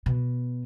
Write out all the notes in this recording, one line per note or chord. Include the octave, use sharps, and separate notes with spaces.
B2